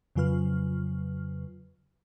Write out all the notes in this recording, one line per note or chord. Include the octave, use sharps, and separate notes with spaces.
F2 C#3 F#3 F4 B4 F6